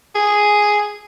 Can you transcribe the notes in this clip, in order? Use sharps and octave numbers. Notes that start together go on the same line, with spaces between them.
G#4